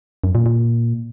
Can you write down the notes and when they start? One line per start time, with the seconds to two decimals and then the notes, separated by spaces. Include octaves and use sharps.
0.24 F#2
0.35 A#2
0.46 A#2